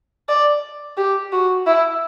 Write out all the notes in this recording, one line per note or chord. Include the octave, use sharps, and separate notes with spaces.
D5
G4
F#4
E4